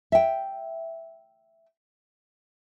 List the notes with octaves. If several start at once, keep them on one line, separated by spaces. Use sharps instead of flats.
E5 G5